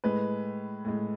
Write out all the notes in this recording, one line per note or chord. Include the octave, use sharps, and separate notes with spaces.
A2 G#3 B4
A2 G#3